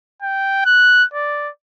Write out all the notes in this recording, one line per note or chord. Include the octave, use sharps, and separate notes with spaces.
G5
F#6
D5